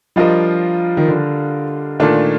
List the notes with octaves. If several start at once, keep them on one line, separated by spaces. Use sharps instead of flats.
F3 G3 D4 F4 A#4 D#5
D#3
D3
A#2 D#3 A3 D4 F4